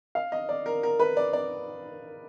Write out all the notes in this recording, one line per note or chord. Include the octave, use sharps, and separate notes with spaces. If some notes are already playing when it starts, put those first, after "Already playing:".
F5
D#5
D5
A#4
A#4
B4
D5
D5